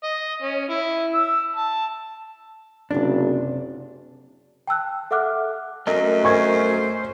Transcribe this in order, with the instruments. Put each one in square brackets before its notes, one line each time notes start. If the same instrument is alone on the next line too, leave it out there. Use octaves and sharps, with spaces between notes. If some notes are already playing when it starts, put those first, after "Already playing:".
[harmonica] D#5
C#4
E4
E6
A5
[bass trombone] F#1 [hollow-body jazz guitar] C3 D4
[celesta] G5 A5 E6 F#6
A4 E5 F#5 D6 F6 F#6
[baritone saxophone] F#2 [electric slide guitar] A3 A#4 D#5
[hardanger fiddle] C5 [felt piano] G#5 C#6 G#6